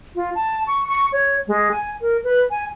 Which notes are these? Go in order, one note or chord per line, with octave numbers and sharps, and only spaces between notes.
F4
A5
C#6
C#6
C#5
G#3
G#5
A#4
B4
G#5